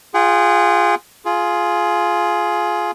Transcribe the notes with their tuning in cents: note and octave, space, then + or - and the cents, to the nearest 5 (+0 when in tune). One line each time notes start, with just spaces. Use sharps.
F4 +0 G#4 -15 F#5 +45
F4 +0 G#4 +15